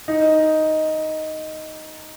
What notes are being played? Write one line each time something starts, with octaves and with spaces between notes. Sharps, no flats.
D#4